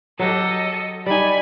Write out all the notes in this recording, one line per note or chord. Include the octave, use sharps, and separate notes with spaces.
F#3 F#4 G4 A4 D#5
G3 D#4 G#5 B5